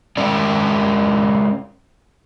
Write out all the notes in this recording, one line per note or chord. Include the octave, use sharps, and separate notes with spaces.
G#3 C#4 A#4 D5